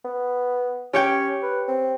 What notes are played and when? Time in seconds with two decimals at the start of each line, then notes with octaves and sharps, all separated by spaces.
0.04 B3
0.93 C#4 G4 C#5 G5
1.43 B4
1.68 C4